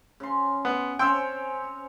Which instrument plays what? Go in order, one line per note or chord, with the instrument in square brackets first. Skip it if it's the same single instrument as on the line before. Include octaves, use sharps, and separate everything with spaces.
[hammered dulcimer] C#3 C6
[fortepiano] B3
[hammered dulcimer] C4 C#4 C#5 [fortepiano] G5 C6 E6